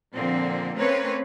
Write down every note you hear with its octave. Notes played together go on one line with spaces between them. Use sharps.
A#2 D3 F3 A#3 C4
A3 A#3 C4 C#4 B4 C#5